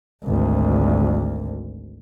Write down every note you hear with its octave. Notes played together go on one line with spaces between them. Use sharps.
G#1 D2